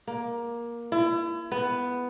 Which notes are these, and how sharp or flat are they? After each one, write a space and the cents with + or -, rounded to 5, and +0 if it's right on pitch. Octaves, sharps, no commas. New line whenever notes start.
A#3 +15
E4 +35
B3 +5